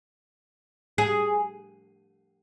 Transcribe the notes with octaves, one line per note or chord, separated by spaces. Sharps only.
G#4